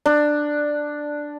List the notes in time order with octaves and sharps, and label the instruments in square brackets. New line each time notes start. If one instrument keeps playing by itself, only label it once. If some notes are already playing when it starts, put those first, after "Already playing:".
[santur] D4